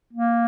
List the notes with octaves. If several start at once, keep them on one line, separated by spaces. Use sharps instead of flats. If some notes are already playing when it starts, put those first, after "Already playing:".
A#3